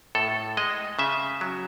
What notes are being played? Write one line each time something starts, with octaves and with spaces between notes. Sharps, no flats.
A2 A4
G#3 D#5
C#3 E5
F#3